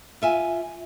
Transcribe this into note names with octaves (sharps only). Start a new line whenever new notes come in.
F4 E5 G#5